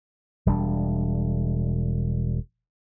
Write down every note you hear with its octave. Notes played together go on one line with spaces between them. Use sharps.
E1 G3 A3 D4